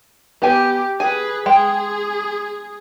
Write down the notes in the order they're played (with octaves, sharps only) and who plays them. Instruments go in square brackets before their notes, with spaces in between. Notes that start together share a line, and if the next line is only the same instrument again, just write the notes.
[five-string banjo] B3 G#5 [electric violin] G4
[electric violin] G#4 B4 [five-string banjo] G#5
[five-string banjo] G#3 G5 [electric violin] G#4